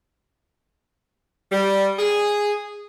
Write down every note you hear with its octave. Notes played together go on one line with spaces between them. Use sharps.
G3
G#4